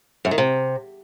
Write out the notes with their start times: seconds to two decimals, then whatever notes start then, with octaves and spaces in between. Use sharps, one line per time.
0.25 F#2
0.31 D#3
0.38 C3